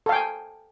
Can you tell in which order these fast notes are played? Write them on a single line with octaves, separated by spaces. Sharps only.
A4 F5 G5 G#5